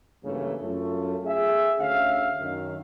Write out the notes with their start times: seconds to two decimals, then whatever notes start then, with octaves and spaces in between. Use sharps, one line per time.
0.24 G2 C#3 E3 F#3 A3 A#3
0.62 F#2 A3 F4
1.25 G#4 E5
1.79 D2 C#4 E5 F5
2.40 F#2 D#3